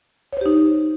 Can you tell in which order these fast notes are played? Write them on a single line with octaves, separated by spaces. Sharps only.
C#5 C5 G4 D#4